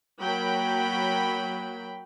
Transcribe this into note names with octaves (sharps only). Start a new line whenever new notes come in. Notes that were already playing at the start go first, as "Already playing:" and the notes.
F#3 A#3 G5 B5